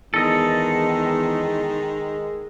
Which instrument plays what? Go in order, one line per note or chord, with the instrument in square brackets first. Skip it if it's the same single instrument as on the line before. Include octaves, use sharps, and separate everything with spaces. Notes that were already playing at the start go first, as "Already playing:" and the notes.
[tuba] E2 [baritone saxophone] D#3 [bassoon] G#3 [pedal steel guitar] A4 D#5